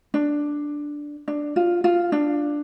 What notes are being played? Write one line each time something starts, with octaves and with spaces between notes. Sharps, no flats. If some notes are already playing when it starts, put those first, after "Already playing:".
D4
D4
F4
F4
D4